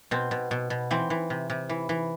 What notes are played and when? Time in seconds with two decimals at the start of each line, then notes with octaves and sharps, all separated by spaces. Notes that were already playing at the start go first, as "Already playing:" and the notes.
0.11 B2 C4
0.31 B2
0.51 B2
0.70 B2
0.91 E3 C4
1.10 E3
1.30 C3
1.50 C3
1.69 E3
1.89 E3